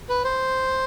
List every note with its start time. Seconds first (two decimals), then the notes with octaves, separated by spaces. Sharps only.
0.09 B4
0.24 C5